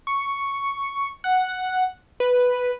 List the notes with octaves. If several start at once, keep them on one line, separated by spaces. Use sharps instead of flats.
C#6
F#5
B4